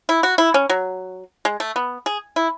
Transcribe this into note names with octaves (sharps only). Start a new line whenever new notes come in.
E4
F#4
E4
C#4
F#3
G#3
A3
B3
G#4
E4